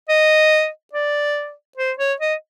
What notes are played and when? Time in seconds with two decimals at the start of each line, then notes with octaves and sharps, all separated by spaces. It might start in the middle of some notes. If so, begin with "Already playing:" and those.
0.09 D#5
0.93 D5
1.78 C5
1.98 C#5
2.20 D#5